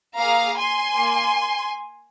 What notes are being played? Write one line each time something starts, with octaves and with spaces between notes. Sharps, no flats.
A#3 G#4 F5 A#5
G#5 C6
A#3